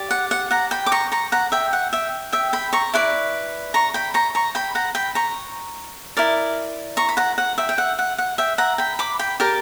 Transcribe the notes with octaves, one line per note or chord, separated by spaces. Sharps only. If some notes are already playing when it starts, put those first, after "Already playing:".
Already playing: G4 D5
F#5
F#5
F#5 A#5
G5 B5
D6
A#5 C#6
A#5 C#6
F#5 A#5
E5 G5
F#5
E5 G5
E5 G5
G5 B5
A#5 C#6
E4 B4 D5
A#5 C#6
G5 B5
A#5 C#6
A#5 C#6
G5 B5
F#5 A#5
G5 B5
A#5 C#6
E4 A#4 D5
A#5 C#6
B5
F#5 A#5
F#5
E5 G5
G5
F#5
F#5
F#5
E5 G5
F#5 A#5
G5 B5
B5 D6
G5 B5
G4 A#4 D5